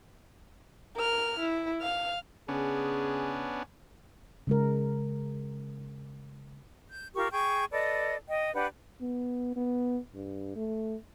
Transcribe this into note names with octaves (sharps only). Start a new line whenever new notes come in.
A#4 F6
E4
F5 F6
C#3 B3 C#4 D4 G#4
C#3 G#3 A#4
G6
F4 G4 A#4 C#6
G#4 G5 C#6 G6
A4 B4 D5 D#5
D#5 G5
D4 G4 B4 F#5
B3
B3
G2
A3